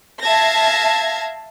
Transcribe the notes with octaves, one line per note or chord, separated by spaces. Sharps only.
E5 F5 A5 G#6 A#6